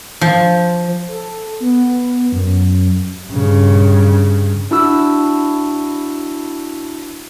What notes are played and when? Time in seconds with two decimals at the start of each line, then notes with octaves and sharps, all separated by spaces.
0.21 F3
1.08 A4
1.60 B3
2.32 F#2
3.28 G2 C#3
4.71 D4 E4 F#4 E6